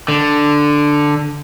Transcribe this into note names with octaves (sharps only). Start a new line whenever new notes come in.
D3